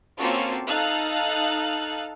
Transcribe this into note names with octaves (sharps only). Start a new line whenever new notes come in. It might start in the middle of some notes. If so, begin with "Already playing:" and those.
A#3 C4 C#4 F4 F#4 A4
D#4 A4 F5 F#6